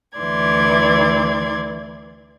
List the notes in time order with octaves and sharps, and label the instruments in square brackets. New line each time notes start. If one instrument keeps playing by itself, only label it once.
[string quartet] D2 E3 D5 C6 G#6